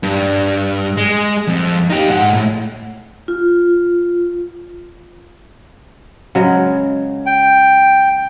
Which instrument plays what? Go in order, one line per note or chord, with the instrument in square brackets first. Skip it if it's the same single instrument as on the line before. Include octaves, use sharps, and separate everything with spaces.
[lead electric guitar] G2
G#3
F2
D#4 G4
G#2 F#5
A2
[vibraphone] F4
[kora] C#3 F#3 G#3
[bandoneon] G5